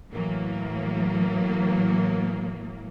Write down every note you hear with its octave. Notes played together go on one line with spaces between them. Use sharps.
A2 E3 F#3 A#3